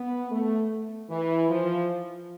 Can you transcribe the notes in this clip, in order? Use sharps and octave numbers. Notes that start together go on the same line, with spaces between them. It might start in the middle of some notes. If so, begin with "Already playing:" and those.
Already playing: B3
A3
E3
F3